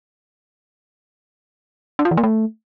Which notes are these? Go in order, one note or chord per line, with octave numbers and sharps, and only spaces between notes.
D4
F4
E3
A#3
A3